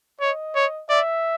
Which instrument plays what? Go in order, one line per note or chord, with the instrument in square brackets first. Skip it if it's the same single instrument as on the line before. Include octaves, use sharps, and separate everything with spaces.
[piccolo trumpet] C#5 [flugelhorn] D#5
[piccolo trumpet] C#5
[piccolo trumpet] D5 [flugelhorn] E5